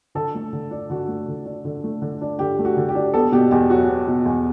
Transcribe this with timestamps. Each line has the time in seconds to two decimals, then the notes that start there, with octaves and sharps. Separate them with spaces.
0.15 D3 A4
0.35 A3
0.53 D3
0.71 D4
0.90 D3 F#4
1.08 A3
1.28 D3
1.46 D4
1.65 D3
1.84 A3
2.02 D3
2.21 D4
2.39 D3 G4
2.59 A3
2.65 F#4
2.77 D3
2.89 G4
2.95 D4
3.14 B3 A4
3.32 B2 G4
3.51 E2 G4
3.70 F#3 F#4
3.89 B3
4.07 B2
4.26 E2